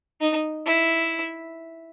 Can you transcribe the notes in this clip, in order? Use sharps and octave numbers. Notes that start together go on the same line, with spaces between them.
D#4
E4